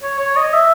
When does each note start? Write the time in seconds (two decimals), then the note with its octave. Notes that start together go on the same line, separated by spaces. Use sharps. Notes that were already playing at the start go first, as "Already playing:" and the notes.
0.03 C#5
0.19 C#5
0.37 D#5
0.54 E5